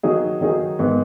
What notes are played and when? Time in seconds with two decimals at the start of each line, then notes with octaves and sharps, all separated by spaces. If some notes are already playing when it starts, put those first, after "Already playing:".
0.03 D#3 F#3 D#4 G#4
0.41 D#3 F#3 D#4 G#4
0.79 G#2 D#3 B3